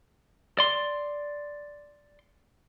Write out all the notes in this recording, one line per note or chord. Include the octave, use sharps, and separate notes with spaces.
D5 C6